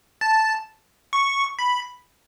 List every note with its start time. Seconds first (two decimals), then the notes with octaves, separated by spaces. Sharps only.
0.21 A5
1.13 C#6
1.59 B5